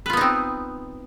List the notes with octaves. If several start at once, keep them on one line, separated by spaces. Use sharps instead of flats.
B3 C4 D#4 F4 B4